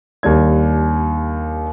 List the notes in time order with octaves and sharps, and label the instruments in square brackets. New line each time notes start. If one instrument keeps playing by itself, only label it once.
[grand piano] D#2 G3 D4 G#6